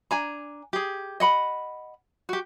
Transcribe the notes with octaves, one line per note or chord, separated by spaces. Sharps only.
D4 G#5 A#5
G4 G#4
D#5 F#5 B5
F#4 G4